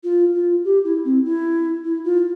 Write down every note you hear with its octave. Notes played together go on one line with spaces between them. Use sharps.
F4
F4
G4
E4
C4
E4
E4
F4